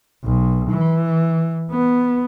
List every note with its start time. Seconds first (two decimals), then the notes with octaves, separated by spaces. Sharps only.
0.24 B1
0.70 E3
1.71 B3